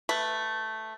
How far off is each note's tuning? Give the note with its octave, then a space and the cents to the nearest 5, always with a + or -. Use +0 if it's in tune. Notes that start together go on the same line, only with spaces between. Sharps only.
A3 +0 B4 +0